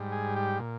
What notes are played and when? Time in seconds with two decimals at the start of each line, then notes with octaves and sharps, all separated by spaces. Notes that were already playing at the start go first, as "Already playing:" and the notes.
Already playing: G#2 G3
0.12 G#4
0.36 G4
0.60 A#2